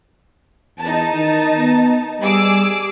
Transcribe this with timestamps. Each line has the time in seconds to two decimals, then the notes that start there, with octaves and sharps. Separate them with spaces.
0.79 E2 D#4 A5
1.14 D#3
1.57 B3
2.22 G3 G#4 D6 E6